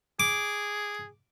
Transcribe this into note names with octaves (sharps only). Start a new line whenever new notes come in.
G#4 D6